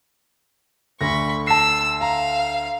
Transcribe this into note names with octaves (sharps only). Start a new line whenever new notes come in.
D2 D3 B5 C#6 A#6
A5 E6 C7
F5 A#5